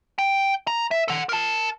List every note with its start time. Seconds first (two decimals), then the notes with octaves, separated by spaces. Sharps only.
0.19 G5
0.67 A#5
0.91 E5
1.08 A4 F#5
1.29 A#4 A5